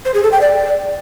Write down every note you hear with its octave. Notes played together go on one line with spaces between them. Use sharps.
C5
G#4
A4
G5
D5